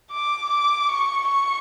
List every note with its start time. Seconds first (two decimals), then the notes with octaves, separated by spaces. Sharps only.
0.11 D6
0.49 D6
0.89 C#6
1.28 C#6